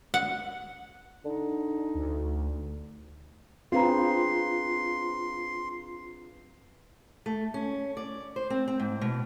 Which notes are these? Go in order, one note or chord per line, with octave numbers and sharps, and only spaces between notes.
F#5
D3 D#4
D2
C4 D4 F4 G#4 B4 F5 A#5 C6
A3
C#4
D5
C5
C4
C4
G#2
B2